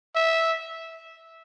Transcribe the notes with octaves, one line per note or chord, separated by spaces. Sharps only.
E5